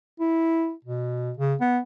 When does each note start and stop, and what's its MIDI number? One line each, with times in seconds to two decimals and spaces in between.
0.20 0.73 64
0.84 1.32 47
1.37 1.55 49
1.61 1.79 59